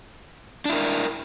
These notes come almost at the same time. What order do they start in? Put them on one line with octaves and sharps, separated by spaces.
D4 E4 A#4